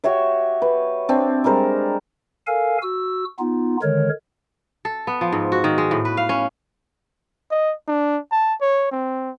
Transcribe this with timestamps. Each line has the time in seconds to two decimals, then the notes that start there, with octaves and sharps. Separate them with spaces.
0.04 F#4 G4 C#5 E5
0.62 B4
1.09 C4 D4
1.44 G3 G#3 A#4 C5
2.47 A4 A#4 F5 G#5
2.82 F#4 E6
3.39 B3 D#4 F4
3.83 D3 D#3 G#3 A#4 C#5
4.85 A4
5.07 B3
5.21 F3
5.33 G#2
5.52 F#4
5.64 D#3
5.78 G#3
5.91 A2
6.05 B4
6.17 F5
6.29 C#4
7.51 D#5
7.88 D4
8.32 A5
8.61 C#5
8.91 C4